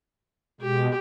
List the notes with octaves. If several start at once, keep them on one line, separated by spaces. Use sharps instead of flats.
B2 G#3 G4